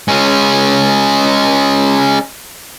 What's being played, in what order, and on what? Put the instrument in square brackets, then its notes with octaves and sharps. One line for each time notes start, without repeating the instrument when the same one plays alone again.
[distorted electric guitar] G#3 C#4